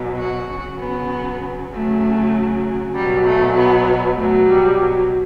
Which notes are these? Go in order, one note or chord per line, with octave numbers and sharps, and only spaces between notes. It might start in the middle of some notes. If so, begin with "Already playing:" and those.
Already playing: B2 F#3
F#4
C#3 F#3
B3
C#3 F#3 A3
B2 F#3 G3
A3
B3
B2 F#3 A3
G3
F#3